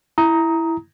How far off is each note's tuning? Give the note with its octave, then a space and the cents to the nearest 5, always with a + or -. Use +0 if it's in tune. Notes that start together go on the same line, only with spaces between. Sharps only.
E4 +0 A#5 +0 D#6 +20